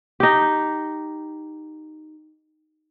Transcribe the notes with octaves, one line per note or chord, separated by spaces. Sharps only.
D#4 G4